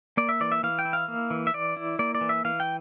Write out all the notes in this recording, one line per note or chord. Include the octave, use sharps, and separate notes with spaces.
A#3 D5
E5
E3 D5
E5
E3 F5
G5
E4
F5
A#3
E3
E5
E3 D5
E4
A#3 D5
D5
E3
E5
E3 F5
G5